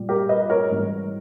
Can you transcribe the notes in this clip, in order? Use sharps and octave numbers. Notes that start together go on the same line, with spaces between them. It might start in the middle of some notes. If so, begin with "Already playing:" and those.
Already playing: A#2 G3
G4 A#4
B4 D#5
A#4 C#5
G#2 E3 G3